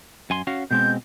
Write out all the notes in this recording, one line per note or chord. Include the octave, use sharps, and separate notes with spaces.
F#2 G#5 C6
C#4 F#4 F5
B2 G#3 C4 G6